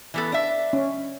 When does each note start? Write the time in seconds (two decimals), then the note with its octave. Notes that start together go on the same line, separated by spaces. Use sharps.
0.14 E3 B3 A4
0.32 D4 E5
0.73 C#4